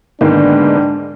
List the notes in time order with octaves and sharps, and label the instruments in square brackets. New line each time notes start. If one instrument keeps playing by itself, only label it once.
[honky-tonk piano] G#2 D#3 A#3 [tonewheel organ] D3 G#3 B3 [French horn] D4